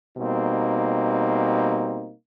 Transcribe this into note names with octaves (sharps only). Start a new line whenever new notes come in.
B2 G3 A#3 C4 D#4